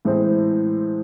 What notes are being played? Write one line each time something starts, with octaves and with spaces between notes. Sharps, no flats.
A2 E3 G#3 C4